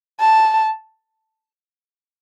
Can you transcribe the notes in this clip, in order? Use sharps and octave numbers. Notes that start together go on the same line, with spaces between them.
A5